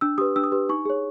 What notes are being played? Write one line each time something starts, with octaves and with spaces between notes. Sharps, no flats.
D4 E6
G4 B4 D#6
D4 E6
D#6
G4 B4
D#4 C#6
G#4 C#5